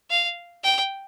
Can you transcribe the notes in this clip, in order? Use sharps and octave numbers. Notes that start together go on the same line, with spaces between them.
F5
G5